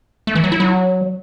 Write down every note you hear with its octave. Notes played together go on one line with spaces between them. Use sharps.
A3
E3
F#3
E4
F#3